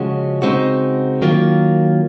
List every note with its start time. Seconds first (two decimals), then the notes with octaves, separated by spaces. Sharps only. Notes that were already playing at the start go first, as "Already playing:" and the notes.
Already playing: C#3 F3 G#3 C#4 F#4
0.42 C#3 G#3 C4 D#4 F#4
1.22 D#3 F#3 A#3 F4